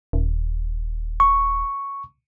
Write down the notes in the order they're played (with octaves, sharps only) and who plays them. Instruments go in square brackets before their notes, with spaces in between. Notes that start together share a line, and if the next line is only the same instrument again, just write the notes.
[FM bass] D#1
[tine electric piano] C#6